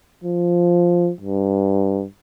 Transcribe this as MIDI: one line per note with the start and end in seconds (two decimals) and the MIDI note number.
0.24 1.10 53
1.21 2.05 43